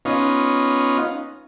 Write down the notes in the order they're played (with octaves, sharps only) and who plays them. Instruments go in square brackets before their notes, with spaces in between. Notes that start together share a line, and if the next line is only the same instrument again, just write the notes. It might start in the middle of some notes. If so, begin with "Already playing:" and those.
[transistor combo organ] B3 C#4 D#4 F4